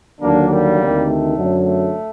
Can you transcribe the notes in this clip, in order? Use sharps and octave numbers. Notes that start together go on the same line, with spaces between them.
D#2 D3 F#3 A#3 D4
G3 A#3
D2 C3 D#3
A3
F#2 D3 F#3
A3